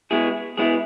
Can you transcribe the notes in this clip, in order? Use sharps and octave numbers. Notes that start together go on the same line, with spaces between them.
B2 G#3 B3 E4 G#4
B2 G#3 B3 E4 G#4